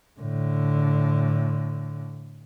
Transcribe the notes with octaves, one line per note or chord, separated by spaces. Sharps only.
A2 D3